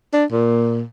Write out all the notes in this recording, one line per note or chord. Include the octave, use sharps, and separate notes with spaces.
D4
A#2